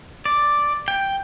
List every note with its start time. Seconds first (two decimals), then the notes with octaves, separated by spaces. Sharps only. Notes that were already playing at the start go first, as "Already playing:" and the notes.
0.26 D5
0.88 G5